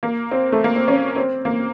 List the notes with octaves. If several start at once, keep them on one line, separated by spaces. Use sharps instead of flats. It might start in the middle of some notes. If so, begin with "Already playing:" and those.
A#3
C4
A3
A#3
C4
C#4
C4
A#3